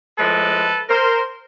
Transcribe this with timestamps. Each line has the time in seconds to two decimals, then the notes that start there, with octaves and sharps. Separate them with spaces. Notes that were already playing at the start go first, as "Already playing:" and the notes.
0.18 A2 F3 G#3 A4 B4
0.89 A#4 C5